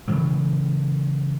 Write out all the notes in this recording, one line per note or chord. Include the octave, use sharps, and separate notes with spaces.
C#3 E3 F#3